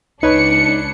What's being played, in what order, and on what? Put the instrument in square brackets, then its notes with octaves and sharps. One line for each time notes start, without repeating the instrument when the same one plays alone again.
[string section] C#2 D4 C#7 [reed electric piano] D#4 [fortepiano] B4 C#5